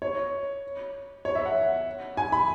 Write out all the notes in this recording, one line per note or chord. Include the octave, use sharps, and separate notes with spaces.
C#5
C#5
E5
F#5
G#5
B5